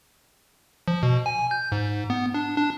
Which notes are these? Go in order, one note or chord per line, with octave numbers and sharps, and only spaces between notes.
F3
B2
G#5
G6
G#2
B3
D4
D4